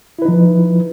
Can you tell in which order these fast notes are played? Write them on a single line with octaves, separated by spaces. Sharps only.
E4 B4 D#4 F3